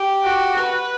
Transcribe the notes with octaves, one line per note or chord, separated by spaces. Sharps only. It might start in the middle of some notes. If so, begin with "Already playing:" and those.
Already playing: G4
F#4
B4